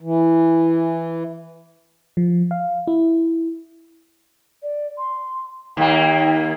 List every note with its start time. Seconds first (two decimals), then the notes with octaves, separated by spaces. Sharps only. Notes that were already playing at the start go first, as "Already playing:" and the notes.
0.01 E3
2.17 F3
2.51 F5
2.87 E4
4.63 D5
4.98 C6
5.77 D#2 A#3 G5